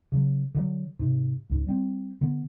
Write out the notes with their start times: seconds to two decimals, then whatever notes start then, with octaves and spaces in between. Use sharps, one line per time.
0.12 C#3 F#3
0.55 D3 E3 F#3
0.99 G#2 C3
1.49 C#2 G#2
1.67 G3 C4
2.21 D3 B3